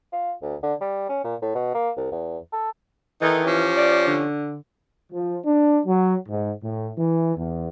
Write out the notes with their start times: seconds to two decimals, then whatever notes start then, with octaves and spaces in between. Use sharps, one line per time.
0.13 F4
0.42 D2
0.63 D3
0.81 G3
1.09 C#4
1.24 A#2
1.42 A2
1.55 B2
1.74 A#3
1.97 C2
2.12 E2
2.53 A4
3.21 D#3 E3 D#4 A4
3.44 F3 C#4 G4
3.77 D5
4.07 D3
5.13 F3
5.45 D4
5.86 F#3
6.28 G#2
6.63 A2
6.98 E3
7.36 E2